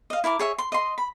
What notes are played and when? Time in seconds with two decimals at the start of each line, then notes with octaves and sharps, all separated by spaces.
0.10 D#5 F5
0.24 E4 A#4 A5 D6
0.39 G#4 C#5 E5
0.58 C6
0.72 D#5 C6
0.98 B5